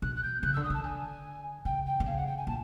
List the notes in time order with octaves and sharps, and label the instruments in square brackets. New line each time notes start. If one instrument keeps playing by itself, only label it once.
[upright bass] B2 [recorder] F#6
[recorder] F#6
G6
[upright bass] C#3 [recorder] F#6
[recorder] E6
[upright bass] D3
[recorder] D#6
[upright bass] D#3 [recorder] A5
[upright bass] D3 [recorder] G#5
[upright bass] C#3 [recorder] G5
[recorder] G5
[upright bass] D3
[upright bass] C#3 [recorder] F5
[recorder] F#5
G5
G#5
[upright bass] A#2 [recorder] A5